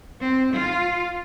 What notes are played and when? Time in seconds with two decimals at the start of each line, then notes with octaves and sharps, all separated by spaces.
0.20 C4
0.53 F4